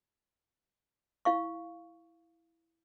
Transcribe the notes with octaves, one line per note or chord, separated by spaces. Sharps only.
E4 F5 C#6